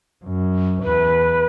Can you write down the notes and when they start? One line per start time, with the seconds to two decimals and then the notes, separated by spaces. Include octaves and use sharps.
0.24 F#2
0.83 E2 B4